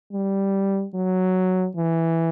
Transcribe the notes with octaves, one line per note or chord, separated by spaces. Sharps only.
G3
F#3
E3